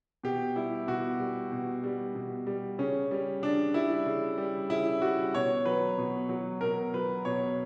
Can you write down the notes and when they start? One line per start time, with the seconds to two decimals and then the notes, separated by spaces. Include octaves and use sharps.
0.24 B2 G4
0.56 G3 E4
0.87 B2 F#4
1.20 G3
1.52 B2
1.84 G3
2.15 B2
2.47 G3
2.79 C#3 C#4
3.11 G3
3.42 C#3 D4
3.74 G3 E4
4.06 C#3
4.38 G3
4.70 C#3 E4
5.02 G3 F#4
5.34 B2 C#5
5.65 F#3 B4
5.98 B2
6.29 F#3
6.61 B2 A#4
6.94 F#3 B4
7.25 B2 C#5